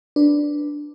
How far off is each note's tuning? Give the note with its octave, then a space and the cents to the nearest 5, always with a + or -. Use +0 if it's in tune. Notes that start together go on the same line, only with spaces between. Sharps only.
D4 +0 B4 +0